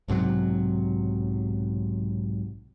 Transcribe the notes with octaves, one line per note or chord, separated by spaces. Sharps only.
B1 G#2 C3 F#3